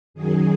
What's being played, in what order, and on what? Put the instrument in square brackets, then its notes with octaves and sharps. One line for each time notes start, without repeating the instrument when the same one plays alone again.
[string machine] F#2 D#3 F#3 G#4